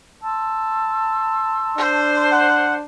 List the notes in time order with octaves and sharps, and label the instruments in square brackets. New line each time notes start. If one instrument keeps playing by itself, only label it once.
[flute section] A5 C6 E6
[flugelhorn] D4 [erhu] C5
[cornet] F#5